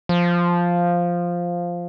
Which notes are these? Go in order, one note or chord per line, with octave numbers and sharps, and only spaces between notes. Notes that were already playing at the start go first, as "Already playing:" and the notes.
F3